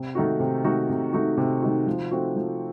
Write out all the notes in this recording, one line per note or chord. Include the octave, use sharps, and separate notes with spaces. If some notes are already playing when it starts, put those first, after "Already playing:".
Already playing: C3
D#3 A3 D#4 F#4
C3
D#3 A3 D#4 F#4
C3
D#3 A3 D#4 F#4
C3
D#3 A3 D#4 F#4
F3
A3 C4 D#4 F#4
F3